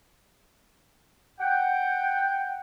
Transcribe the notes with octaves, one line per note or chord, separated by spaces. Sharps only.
F#5 G5